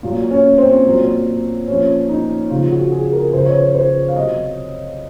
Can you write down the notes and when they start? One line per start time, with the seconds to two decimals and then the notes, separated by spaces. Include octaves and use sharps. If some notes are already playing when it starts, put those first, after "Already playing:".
0.03 A#2 F#3 F4
0.31 C#4
0.58 C4
0.85 A#2 F#3
1.68 A#2 F3 C#4
2.09 D#4
2.50 C#3 F3 F4
2.71 F#4
2.92 G#4
3.13 A#4
3.33 C#3 F3 C5
3.46 C#5
3.58 C5
3.75 C5
4.08 F5
4.16 C3 F#3 D#5